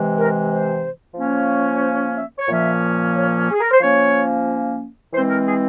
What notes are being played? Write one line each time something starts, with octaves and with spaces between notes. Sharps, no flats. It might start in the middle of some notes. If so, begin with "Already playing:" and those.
Already playing: C3 E3 G#3
A#4
C5
F3 A#3 C#4
C5
E5
C#5
A#2 F3 A#3 C#4 E5
C#5
G#4
A#4
C5
F3 A#3 C#4 C#5
E3 G#3 C4 C5
A#4
G#4